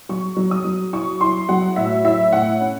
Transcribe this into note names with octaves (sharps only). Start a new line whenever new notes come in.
F#3 C#6
F#3
D#6
F#3
E4 C#6
E4 C6
F#3 F#5
A2 E5
E4 E5
A2 F#5
C#4